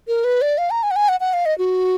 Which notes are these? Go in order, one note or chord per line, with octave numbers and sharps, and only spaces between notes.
A#4
B4
D5
F5
A#5
G#5
F#5
G#5
F#5
F#5
F5
D#5
F#4